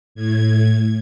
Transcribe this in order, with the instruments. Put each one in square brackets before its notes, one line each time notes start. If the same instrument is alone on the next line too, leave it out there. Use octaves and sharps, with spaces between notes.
[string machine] A2 G#6